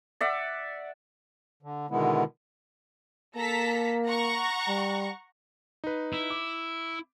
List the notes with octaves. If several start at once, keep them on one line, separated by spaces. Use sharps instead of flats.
D5 E5 F#5
D3
B2 D3 D#3 G#3 B3 E4
A#3 A4 A#5 B6
F#5 A#5 C#6
G3
D#4 B4
E4
D6